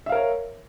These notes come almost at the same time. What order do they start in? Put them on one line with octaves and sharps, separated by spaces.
E5 F5 A#4 C#5